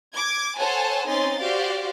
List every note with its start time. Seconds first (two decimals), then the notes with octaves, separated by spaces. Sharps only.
0.13 D6 G#6
0.58 A4 C5 C#5 F#5 G#5 A5
1.07 C4 C#4 D#4 G#5 C6 A6
1.40 F#4 G4 C5 D5 F5